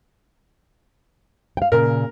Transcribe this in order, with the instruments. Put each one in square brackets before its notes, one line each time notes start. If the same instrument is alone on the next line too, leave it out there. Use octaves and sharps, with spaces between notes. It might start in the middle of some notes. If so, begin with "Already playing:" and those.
[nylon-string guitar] F5 G5
[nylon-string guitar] A#2 C#3 [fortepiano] A#4